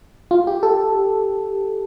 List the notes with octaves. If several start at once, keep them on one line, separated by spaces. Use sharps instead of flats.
F4
G4
A4